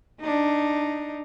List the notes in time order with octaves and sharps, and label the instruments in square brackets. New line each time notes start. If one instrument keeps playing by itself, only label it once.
[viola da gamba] D4 D#4